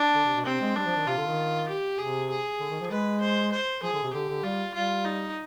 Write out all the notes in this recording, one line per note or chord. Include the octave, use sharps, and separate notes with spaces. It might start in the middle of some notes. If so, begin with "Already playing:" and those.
Already playing: D4
D3
C3
B2
C3 C4
G#3
G3 D4
F3
D#3
C3 F4
D3
D#3
G4
C3 G#4
G#4
D3
D#3
F3
G#3 B4
C5
C5
F3 G#4
D3
C3
D3 G4
D3
G3 F4
G3 F4
D#4